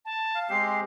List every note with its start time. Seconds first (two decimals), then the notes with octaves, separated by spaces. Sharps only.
0.05 A5
0.35 F5
0.50 G#3 C4 G4 C7